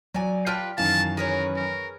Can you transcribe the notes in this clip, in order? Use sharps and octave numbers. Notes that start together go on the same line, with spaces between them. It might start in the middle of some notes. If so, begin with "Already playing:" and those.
F#3 D5 G#5
F4 G4 B4 G5 A5 F6
F#2 D#3 E3 F5 A5
G#4 A#4 B4 C#5
A#4